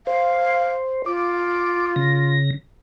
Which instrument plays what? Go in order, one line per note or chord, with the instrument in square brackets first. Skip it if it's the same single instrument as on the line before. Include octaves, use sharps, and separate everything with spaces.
[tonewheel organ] C5 [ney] F5
[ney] F4 [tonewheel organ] D6
[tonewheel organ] C#3 A#6